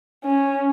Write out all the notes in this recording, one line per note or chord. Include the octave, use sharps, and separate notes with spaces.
C#4